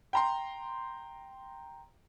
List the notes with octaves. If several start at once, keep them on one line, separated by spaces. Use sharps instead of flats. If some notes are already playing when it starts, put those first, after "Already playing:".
G5 A#5 C6